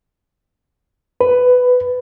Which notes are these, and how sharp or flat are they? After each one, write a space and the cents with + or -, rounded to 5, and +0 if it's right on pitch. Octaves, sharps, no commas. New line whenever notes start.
B4 +10